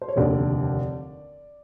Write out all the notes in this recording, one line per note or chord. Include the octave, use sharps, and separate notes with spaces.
C5
C#5
F1 D#2 D3 D5